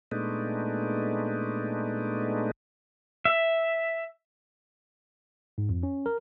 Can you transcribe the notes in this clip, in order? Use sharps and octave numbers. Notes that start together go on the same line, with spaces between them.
A#2 G#3 A3 B3 D4 D#4
E5
G#2
F2
C#4
A#4